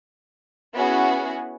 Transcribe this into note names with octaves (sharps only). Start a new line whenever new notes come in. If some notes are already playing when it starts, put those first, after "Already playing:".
B3 C#4 E4 F#4 G#4 F#5